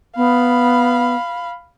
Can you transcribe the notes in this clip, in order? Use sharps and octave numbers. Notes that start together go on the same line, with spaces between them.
B3 F5 B5